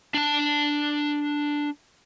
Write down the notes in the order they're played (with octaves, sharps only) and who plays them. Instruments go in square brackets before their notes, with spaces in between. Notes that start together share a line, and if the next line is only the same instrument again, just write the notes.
[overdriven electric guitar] D4 A5